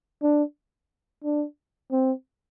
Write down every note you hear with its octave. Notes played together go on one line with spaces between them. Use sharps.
D4
D4
C4